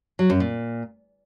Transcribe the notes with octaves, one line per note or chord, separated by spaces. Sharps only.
F#3
F#2
A#2